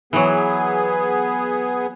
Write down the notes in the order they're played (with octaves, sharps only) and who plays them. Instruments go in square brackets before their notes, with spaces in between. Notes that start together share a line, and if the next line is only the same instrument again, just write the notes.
[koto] E3 F#3 [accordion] B3 G#4